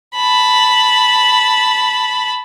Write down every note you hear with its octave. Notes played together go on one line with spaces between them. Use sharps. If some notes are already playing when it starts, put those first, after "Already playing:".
A5 B5